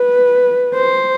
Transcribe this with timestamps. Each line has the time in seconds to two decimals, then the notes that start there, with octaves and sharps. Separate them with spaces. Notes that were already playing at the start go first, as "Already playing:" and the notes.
Already playing: B4
0.75 C5